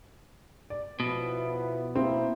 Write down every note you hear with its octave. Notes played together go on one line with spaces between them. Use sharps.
D5
B2 F3 B3 E4
A#3 C4 E4